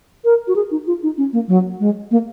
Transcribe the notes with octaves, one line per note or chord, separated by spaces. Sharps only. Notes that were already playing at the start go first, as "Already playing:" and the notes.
A#4
F#4
G#4
D#4
F4
D#4
C#4
A#3
F#3
G#3
A#3